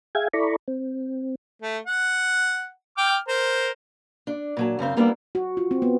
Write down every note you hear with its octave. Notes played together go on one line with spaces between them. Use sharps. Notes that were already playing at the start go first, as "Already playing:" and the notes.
G#4 E5 F5 G5 G#5 G#6
E4 A4 D5 A#5 B5 C#6
C4
A3
F#5
G5 D6 F6
A#4 C5 A#5
D4
A#2 F#3 A5
F#2 C#3 C4 C5
G3 A#3 B3 D4 E4
F#4
F4
C4
B3